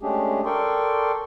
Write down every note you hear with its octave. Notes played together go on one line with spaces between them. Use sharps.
G#3 A3 C#4 D4 G4 G#4
A4 A#4 D5 G5 C6 C#6